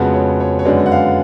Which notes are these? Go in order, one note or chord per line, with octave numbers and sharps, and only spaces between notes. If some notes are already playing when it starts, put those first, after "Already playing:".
Already playing: F2 C#3 G#3 B3 F#4
C#5
C#5
C#5
F#2 D3 G#3 B3 D5
F#5
F5